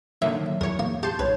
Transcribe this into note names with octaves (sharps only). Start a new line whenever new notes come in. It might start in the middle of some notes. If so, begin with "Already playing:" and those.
D3 D#3 F#3 A#3 E5
E2 A#4 C#5
A#3
G4 A5 C6 G6
B1 B4 C#5